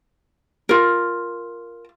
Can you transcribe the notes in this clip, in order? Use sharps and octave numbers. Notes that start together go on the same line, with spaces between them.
F4 A#4